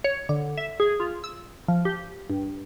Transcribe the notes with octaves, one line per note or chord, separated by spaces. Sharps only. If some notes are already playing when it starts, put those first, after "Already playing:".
C#5
D3
E5
G#4
F4
E6
F3
G4
G2